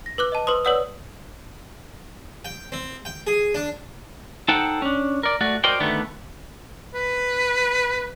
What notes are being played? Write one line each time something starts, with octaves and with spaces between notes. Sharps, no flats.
A#6
B4 D6 F#6
D#5 A5
B4 C5 C6 D#6
B4 C#5 D5 F#5 D#6 E6
G5
C4
G5
G#4
D4
D#4 A4 C5 F#5 G5 A5
C#4 D4
A#4 D5
A3 F#4 D5
F#4 A#4 C5 D5 D#5 G5
D2 D3 D#3 A3 B3
B4